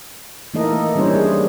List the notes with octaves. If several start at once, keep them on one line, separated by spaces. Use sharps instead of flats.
E3 A3 A#3 D#4 A4 D#5
E3 G3 C#4 D4 C5 C#5
G#4